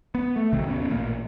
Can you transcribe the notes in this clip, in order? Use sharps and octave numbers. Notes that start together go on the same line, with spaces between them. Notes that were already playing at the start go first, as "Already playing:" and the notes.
B3
A3
B1 C3 D#3 F#3
D1 D#2 B3 C#4
A1 A#2 A#3